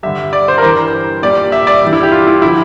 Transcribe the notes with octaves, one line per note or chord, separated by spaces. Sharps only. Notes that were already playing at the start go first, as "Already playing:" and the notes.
G2 D3 G3 E5
D5
C5
A#4
G2 E3 G3 C5
A#2 G3 D5
E5
D5
G2 E3 G3
E4
G4
F4
E4
D3 F3 E4